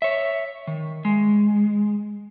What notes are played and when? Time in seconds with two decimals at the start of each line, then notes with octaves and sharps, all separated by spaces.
0.02 C#5 E5
0.67 D#3
1.05 G#3